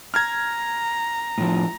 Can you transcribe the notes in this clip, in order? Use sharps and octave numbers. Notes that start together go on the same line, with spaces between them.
A#5 F6 G#6
A2 F3